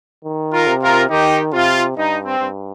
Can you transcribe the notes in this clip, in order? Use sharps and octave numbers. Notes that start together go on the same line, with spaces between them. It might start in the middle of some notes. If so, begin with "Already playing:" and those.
D#3
F4 A#4
C3
F4 A#4
D#3 D#4 G4
C3 F4
G2 D#4
C4
G2